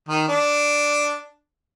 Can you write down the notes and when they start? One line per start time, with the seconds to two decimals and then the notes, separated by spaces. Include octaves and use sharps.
0.08 D#3
0.28 D4